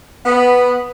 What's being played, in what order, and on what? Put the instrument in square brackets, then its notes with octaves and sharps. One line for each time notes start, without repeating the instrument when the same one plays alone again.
[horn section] B3